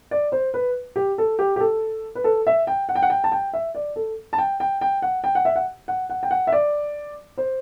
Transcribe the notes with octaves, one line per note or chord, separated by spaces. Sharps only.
D5
C5
B4
G4
A4
G4
G4
A4
B4
A4
E5
G5
F#5
G5
F#5
G5
A5
G5
E5
D5
A4
A5
G5
G5
G5
F#5
G5
F#5
E5
F#5
F#5
F#5
G5
F#5
E5
D5
C5